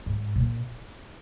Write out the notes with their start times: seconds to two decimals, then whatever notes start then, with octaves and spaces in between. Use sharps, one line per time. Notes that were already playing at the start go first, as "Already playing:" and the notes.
0.06 G#2
0.36 A#2